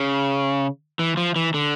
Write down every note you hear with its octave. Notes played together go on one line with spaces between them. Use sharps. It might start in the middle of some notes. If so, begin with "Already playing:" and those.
Already playing: C#3
E3
F3
E3
D3